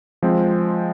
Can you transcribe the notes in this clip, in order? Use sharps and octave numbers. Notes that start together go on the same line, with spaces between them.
F3 G#3 C4